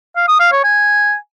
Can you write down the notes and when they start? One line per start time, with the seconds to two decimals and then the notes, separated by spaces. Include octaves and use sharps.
0.16 F5
0.28 D#6
0.40 F5
0.52 C#5
0.64 G#5